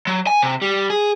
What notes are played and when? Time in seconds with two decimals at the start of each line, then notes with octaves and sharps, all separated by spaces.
0.07 F#3
0.27 G#5
0.42 C3
0.62 G3
0.90 G#4